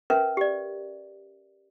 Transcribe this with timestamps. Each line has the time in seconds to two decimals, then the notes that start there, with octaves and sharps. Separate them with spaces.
0.10 C#4 A#4 B4 E5
0.37 G4 D5